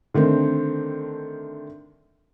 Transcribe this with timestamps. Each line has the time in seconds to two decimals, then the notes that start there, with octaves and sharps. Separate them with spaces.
0.14 D3 D#3 A3 C4